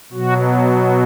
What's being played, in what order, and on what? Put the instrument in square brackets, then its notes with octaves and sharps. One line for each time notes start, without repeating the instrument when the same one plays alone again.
[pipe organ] B2 F#3 F#4